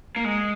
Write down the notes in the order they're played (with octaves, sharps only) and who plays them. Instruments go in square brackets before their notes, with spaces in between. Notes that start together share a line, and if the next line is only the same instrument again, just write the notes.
[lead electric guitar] A#3
G#3